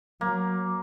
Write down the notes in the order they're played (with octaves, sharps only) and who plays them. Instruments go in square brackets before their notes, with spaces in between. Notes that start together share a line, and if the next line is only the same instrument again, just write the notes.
[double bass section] F#3 [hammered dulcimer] A#3